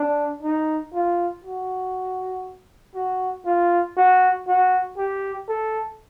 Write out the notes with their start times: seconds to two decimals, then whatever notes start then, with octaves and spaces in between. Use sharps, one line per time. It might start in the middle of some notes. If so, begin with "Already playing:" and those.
Already playing: D4
0.43 D#4
0.94 F4
1.44 F#4
2.95 F#4
3.46 F4
3.97 F#4
4.48 F#4
4.98 G4
5.49 A4